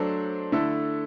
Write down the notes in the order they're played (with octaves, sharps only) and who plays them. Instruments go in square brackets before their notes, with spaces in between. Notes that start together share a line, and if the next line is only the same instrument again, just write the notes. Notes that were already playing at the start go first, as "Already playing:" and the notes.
Already playing: [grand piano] F#3 A3 D4 A4 C5
D3 A3 E4 A4